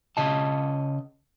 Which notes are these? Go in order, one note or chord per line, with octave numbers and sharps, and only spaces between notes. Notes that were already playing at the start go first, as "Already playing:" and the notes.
C#3 D#5 A5